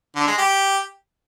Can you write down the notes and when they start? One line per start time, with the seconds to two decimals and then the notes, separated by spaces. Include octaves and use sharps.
0.16 D3
0.27 G#3
0.38 G4